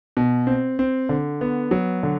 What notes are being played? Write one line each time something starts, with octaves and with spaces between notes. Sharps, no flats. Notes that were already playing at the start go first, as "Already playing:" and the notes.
B2
C4
C4
D3
B3
F#3
D3